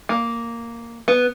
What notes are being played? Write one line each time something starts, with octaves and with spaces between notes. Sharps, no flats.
A#3
B3